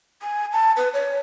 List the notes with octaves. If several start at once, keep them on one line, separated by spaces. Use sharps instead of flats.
G#5
A5
B4
C#5